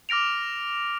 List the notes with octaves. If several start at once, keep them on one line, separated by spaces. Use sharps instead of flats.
D6 F6 A#6 D7 F7